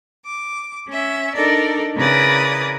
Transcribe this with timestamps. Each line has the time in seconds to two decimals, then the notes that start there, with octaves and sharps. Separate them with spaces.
0.25 D6
0.87 C#4 E5
1.35 D4 D#4 A4 A#4 D5
1.96 C#3 E4 A#4 B4 D5 D#6